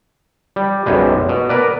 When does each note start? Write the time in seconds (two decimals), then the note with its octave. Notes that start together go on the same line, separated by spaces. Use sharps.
0.56 G3
0.86 B1 F#2 G3 G#3
1.29 B2
1.49 A#4 B4 D5